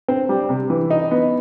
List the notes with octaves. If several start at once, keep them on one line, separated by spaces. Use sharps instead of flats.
C4
G3
C3
E3
D#4
B3